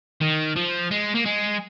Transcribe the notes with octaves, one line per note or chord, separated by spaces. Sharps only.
D#3
F3
G#3
A#3
G#3